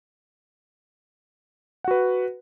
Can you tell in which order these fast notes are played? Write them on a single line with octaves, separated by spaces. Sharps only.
F#5 F#4 B4